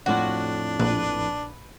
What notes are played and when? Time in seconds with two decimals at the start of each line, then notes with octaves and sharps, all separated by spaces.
0.06 F2 A2 D4 F4 F#4
0.80 A#1 B4